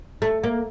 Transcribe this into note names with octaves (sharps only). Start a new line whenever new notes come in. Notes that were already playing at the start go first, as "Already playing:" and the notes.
A3
A#3